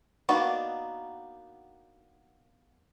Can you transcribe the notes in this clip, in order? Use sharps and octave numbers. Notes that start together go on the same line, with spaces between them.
A#3 B3 D4 D#4 F#4